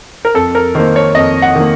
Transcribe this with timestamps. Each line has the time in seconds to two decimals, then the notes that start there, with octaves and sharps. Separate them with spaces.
0.25 A#4
0.34 F2 A4
0.55 A#4
0.75 D#3 A#3 C5
0.96 C#5
1.15 F2 D#5
1.42 F#5
1.55 D#3 A#3